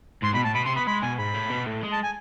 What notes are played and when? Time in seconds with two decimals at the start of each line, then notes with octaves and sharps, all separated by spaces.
0.23 G#2 C6
0.34 B2 B5
0.44 A2 A5
0.55 B2 B5
0.65 C3 C6
0.76 B3 B5
0.87 G#3 B5
1.02 B2 G#5
1.19 G#2 B5
1.34 A2
1.50 B2
1.66 A2
1.82 G#3
1.92 A5
2.03 G#5